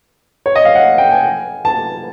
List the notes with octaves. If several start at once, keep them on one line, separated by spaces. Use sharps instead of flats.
C#5
D#5
F5
F#5
G5
G#5
A5